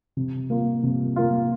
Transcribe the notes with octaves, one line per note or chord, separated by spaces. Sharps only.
C3
A#3 F4
C3
A#3 F4